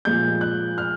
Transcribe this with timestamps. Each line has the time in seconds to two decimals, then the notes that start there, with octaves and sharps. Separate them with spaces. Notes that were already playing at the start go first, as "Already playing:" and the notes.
0.05 A#2 F3 G#3 G6
0.41 F#6
0.78 F6